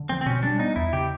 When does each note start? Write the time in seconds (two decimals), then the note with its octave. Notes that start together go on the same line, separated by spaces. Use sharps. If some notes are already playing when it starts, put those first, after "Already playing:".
Already playing: D3
0.09 F3 C4
0.21 C4
0.26 B2 C#4
0.43 G3 D4
0.59 B3 D#4
0.76 E2 E4
0.93 C#3 G4